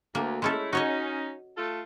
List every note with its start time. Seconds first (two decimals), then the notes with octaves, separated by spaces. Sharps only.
0.15 D2 A#3
0.42 G#3 A3 C#4 E4 A4
0.73 C#4 D#4 F#4 C#5 D#5
1.57 A3 F4 A4